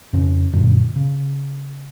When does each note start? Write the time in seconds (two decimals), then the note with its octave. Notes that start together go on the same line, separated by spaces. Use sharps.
0.13 F2 C#3 C#4
0.53 F#2 A#2 D3
0.96 C#3